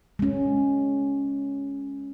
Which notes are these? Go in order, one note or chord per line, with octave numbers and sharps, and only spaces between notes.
G#3 C#4